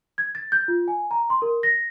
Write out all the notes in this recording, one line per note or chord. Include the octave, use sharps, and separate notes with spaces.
G#6
A6
G6
F4
G#5
A#5
C6
A#4
A#6